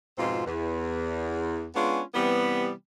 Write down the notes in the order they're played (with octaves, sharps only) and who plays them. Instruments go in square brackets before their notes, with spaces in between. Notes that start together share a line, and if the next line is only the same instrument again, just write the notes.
[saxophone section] F2 G#2 B2 C4 F4
E2
G#3 B3 C#4 D4 F4
C3 E3 G3 B3